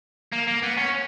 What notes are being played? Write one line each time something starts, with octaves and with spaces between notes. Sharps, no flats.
A#3
A#3
B3
C#4